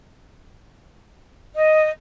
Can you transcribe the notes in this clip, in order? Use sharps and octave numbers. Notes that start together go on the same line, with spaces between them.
D#5